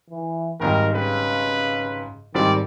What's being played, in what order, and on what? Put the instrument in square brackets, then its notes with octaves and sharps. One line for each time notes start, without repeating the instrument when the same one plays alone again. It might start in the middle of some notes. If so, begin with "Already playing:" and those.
[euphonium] E3
[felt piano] G#1 G#2 G3 [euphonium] D#3 [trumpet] A#4
[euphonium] C#3 [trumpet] B4
[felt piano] G#2 G3 C4 [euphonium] D#3 [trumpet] D5